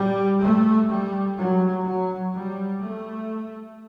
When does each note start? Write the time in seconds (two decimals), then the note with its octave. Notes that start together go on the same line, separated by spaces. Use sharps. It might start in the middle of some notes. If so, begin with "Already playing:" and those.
Already playing: G3
0.41 A3
0.89 G3
1.37 F#3
1.85 F#3
2.34 G3
2.82 A3